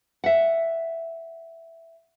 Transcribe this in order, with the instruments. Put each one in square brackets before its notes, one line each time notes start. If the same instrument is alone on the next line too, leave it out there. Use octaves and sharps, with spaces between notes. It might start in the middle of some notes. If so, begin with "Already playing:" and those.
[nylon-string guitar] E5 F#5